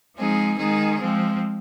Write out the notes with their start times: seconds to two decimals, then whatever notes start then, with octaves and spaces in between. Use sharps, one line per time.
0.17 F3 G#3 C4 D#4 G#4
0.58 D#3 G#3 D#4 G#4
1.00 F3 G#3 C4